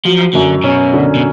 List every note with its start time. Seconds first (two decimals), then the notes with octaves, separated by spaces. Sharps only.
0.05 F3 F#3
0.34 F#2 D3
0.64 B2 C#4
0.94 D3
1.15 B2